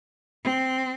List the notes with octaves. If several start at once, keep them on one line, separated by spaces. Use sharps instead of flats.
C4